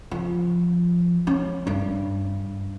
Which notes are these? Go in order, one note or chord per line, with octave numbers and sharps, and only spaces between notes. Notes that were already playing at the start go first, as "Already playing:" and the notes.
F3
C#4
G2